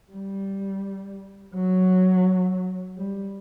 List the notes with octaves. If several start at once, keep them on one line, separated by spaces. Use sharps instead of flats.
G3
F#3
G3